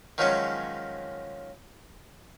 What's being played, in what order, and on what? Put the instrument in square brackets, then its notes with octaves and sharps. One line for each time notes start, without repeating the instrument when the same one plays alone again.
[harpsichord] D#3 F3 F#3 G#3 C#4